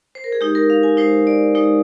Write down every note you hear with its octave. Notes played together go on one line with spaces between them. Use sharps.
C5
A#4
G#4
G#3 D#4 G4
A#4
F5
G#5
G#3 D#4 C5
D5
G#3 D#4